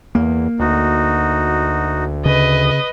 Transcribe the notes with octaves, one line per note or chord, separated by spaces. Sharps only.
E2 A#3
D2 D#4 F#4
C#3 B4 D#5